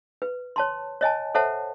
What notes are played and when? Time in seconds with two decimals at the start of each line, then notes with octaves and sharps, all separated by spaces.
0.22 B4
0.56 C#5 A5 C6
1.01 C#5 D#5 G#5 A5
1.35 A4 C5 C#5 E5 F#5 A5